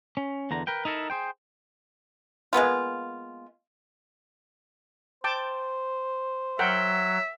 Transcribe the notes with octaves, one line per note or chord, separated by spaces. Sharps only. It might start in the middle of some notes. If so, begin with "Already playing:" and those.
C#4
E2 D3 A#5
A#4 B4 G5
D#4 E4 A4 A#4
G#4 C5 G5
G#3 A#3 B3 F4
C5 G5 A5 D6
F#3 A#4 E5 F#5 G5